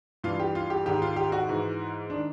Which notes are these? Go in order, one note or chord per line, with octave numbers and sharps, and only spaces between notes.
G2 E3 F4
G4
F4
G4
G#2 D#3 G4
F4
G4
F#4
G#2 E3
D#3 D4